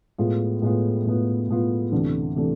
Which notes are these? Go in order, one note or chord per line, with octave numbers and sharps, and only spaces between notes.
A2 G#3 B3 F4
A2 G#3 B3 F4
A2 G#3 B3 F4
A2 G#3 B3 F4
D2 C3 E3 A3 D4
C3 E3 A3 D4